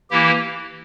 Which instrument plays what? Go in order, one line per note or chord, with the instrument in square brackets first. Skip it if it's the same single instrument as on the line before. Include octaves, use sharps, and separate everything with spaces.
[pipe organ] E3 A#3 E4 G4